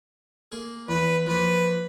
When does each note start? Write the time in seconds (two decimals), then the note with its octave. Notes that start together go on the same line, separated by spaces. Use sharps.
0.52 A#3 G#4
0.88 E2 B4
1.26 F3 A#3 B4